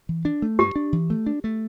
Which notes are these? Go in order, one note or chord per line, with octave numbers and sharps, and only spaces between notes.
E3
D4
A3
G2 G4
D4
E3
A3
D4
A3